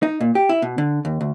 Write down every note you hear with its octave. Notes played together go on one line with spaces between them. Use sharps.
D#4
A#2
G4
E4
B2
D3
D#2
D2